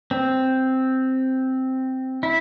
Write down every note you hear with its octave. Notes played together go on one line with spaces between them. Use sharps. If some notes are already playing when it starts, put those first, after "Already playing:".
C4
E4